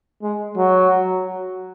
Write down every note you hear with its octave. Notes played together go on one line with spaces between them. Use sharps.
G#3
F#3